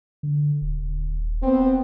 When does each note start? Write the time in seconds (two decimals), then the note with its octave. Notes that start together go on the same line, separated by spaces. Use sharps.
0.23 D3
0.61 D#1
1.42 B3 C4